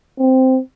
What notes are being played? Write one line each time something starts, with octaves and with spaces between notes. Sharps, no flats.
C4